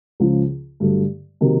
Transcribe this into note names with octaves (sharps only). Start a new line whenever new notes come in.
C#2 C#3 F3
G2 D3 F#3 A3
C3 D#3 F#3 A#3